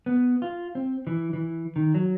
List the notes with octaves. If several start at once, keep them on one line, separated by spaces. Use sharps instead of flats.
B3
F4
C4
E3
E3
D#3
F#3